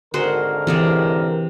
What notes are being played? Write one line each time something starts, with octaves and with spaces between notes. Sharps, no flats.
G#1 D3 F#4 G#4 A#4 C5
C3 E3 G#4 D5